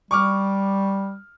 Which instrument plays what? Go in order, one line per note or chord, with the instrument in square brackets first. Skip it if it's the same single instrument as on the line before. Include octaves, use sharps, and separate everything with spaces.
[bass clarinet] G3 [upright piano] C#6 D6 F6